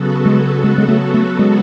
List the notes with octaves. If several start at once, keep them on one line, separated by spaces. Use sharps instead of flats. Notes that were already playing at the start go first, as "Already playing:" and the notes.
Already playing: C#3 F#3 B3 F#4 A4
G#3
G#3
G#3
A3
A3
G#3